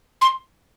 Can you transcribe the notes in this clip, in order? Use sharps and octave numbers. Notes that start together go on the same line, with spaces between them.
C6